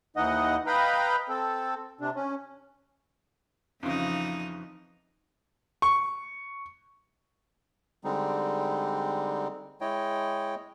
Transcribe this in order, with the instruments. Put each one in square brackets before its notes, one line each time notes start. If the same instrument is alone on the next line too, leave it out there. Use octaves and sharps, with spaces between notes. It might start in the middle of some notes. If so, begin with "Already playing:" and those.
[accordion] D#2 E3 D#4 D#5 F#5
B4 D#5 F5 G5 A#5 B5
C4 A4
C3 D4
C#4
[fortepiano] F2 C#3 [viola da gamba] E3 F3 D#4
[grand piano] C#6
[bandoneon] D3 G3 G#3 C4 D#4
G#3 E4 C#5 D#5 G5